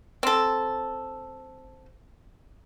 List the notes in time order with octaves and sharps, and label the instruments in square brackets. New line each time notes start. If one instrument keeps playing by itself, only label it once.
[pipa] C4 A4